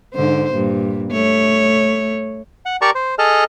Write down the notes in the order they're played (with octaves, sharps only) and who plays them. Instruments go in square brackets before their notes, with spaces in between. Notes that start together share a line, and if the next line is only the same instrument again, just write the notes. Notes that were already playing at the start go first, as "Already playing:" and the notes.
[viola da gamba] G#2 D3 C5
G2 A#2
A3 C#5
[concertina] F#5
G4 A#4 D5 A5 A#5 C#6
C5
G#4 A4 D#5 A5 F6